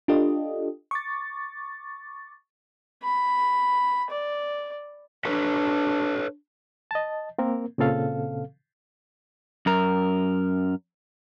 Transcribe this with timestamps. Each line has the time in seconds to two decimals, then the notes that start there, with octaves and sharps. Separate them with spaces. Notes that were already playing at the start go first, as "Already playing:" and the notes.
0.08 D4 F4 G4 A4 D#5
0.91 C#6 D6 A6
3.03 B5
4.10 D5
5.25 D4 A4 B4 C#5
6.91 D#5 A5
7.38 A#3 C4 A#4
7.78 A#2 C#3 C4 A4 F5
9.66 F#2 A#4